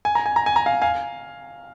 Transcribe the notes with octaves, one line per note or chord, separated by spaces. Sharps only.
G#5
A#5
G#5
A#5
G#5
A#5
F5 G#5
F5 G#5